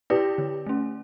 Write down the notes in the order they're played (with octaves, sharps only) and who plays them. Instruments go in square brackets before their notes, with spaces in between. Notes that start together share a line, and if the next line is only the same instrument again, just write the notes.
[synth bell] E4 B4 D5 [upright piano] G4
[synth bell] D3
A3 C#4